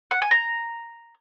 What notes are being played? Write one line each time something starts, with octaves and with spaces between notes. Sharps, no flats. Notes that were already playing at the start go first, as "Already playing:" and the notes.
F#5
G#5
A#5